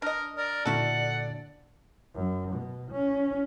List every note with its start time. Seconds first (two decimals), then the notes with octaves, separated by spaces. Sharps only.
0.02 D4 A#4 D#5
0.37 A#4 D5
0.65 A#2 D3 E4 F#4 A4 F#5
2.15 F#2
2.52 B2
2.91 C#4